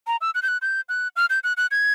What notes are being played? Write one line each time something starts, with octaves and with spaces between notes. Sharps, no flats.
A#5
E6
F#6
G6
F#6
G6
F#6
F6
G6
F#6
F#6
G#6